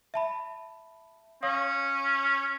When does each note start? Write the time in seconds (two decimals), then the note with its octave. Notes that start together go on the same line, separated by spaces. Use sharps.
0.14 E5 A5 B5
1.43 C#4 C#5 F5 D#6